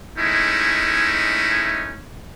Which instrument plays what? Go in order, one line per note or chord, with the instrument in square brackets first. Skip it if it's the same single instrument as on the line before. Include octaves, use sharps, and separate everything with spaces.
[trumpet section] G#3 A3 C#4 D#4 E4